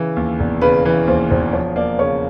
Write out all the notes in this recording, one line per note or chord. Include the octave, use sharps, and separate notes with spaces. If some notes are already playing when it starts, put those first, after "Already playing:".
Already playing: C#3 E3 B4
D#2
E1
C#3 B4
E3 B4
D#2 C5
E1 C5
F3 C#5
A#3 D5
C#3 C#5